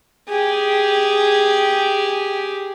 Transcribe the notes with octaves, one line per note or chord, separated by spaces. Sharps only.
G4 G#4